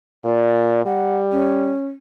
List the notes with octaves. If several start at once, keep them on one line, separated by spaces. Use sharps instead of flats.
A#2 D5
G3 F#5
C#4